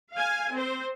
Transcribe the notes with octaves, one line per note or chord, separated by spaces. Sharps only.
F5 G#5
C4 C5